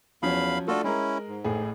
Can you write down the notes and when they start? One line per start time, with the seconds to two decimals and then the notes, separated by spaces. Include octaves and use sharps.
0.23 E2 F3 F#3 C#4 F5 B5
0.68 A3 D4 F4 F#4 A4
0.84 G#3 C#4 E4 A#4
1.28 G#2
1.44 A1 A2 G#4